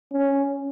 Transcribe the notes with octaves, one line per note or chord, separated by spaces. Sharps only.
C#4